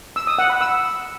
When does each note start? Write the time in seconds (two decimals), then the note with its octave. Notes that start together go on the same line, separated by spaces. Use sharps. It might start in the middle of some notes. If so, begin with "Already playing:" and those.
0.16 E6
0.27 D#6
0.38 F#5
0.50 B5
0.61 E6